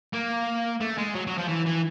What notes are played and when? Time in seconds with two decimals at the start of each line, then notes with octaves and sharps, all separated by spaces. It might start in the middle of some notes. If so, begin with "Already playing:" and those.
0.14 A#3
0.81 A3
0.98 G#3
1.15 F#3
1.27 F#3
1.38 F3
1.48 E3
1.66 E3